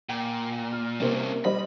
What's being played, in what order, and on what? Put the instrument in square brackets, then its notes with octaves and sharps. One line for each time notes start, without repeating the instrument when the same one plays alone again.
[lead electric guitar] A#2 [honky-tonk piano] G5
[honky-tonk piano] F6
[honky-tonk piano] C3 A#3 C4 [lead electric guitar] G3 C#4
[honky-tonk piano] G3 C5 D#5 [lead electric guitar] B5